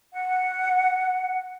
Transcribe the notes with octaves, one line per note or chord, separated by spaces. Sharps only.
F#5